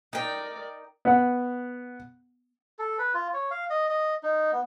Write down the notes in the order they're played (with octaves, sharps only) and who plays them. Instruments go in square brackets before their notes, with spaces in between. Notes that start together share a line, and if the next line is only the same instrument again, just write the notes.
[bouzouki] D#4 G5 [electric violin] A#4 D5
[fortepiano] B3 F#5
[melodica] A4
B4
F4
C#5
F5
D#5
D#5
D#4
B3